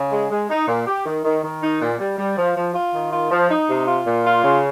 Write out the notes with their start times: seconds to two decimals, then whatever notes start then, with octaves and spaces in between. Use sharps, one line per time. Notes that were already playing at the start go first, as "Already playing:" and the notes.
Already playing: C#3
0.11 G#3
0.30 G#3
0.49 D#4
0.67 A#2
0.86 G4
1.05 D#3
1.24 D#3
1.43 D#3
1.62 D#4
1.81 A#2
1.99 G3
2.18 G3
2.37 F3
2.56 F3
2.74 F4
2.93 D#3
3.11 F4
3.31 F3
3.49 D#4
3.68 C3
3.86 F4
4.05 A#2
4.24 F4
4.43 C#3